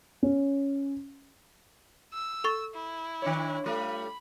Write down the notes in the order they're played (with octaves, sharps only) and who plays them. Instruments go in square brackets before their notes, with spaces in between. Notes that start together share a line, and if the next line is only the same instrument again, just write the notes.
[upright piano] C#4
[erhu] E6
[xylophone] A4 C#6 A6
[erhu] E4
[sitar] D#3 D4 C#5
[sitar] G3 A3 F4 [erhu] B5